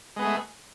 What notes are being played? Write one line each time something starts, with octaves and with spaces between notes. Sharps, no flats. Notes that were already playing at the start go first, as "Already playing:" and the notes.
G#3 A3 B3 G#4